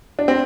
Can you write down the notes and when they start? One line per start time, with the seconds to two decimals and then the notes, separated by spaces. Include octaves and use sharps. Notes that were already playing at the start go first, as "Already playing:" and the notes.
0.19 D4
0.28 C4